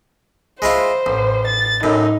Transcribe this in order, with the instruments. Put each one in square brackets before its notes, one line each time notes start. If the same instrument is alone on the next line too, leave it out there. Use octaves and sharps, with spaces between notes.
[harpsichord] G#3 E4 F4 [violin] C5
[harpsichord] A1
[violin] A6
[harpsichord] F#2 A2 [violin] D#4